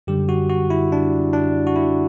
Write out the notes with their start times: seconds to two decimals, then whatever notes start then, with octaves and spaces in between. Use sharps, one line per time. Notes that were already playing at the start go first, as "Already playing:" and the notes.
0.07 F#2 D3 G3 G4
0.29 F#4
0.49 F#4
0.70 E4
0.92 D4
1.33 D4
1.67 F#4
1.76 E4